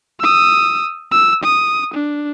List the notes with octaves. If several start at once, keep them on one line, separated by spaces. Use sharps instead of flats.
D#6 E6
E6
D#6
D4